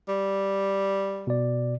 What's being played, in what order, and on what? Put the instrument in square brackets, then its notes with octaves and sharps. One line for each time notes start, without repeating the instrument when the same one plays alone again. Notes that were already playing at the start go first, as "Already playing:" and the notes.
[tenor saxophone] G3
[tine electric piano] B2 D5